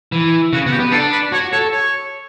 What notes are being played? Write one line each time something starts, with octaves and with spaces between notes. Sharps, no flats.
E3
C#3 F#4
B3 F#4
G4
B3
D4 A4
B4
F#4 C#5
A4 C#5
C#5